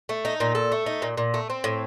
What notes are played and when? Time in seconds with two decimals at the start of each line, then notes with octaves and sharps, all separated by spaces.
0.09 A3
0.25 D#4
0.40 A#2
0.55 A4
0.72 A3
0.86 D#4
1.02 A#2
1.17 A#2
1.34 A3
1.50 C4
1.64 A2